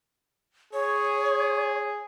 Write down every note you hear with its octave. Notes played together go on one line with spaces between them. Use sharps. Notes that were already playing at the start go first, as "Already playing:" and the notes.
G#4 C#5